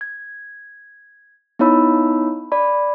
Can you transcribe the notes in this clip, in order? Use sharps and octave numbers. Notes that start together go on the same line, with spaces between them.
G#6
B3 D#4 E4 C#5 B5 E6
D5 B5